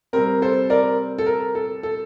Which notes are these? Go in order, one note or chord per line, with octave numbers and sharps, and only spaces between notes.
C3 G3 C4 A#4
A4 C5
A#4 D5
A4
A#4
A4
A4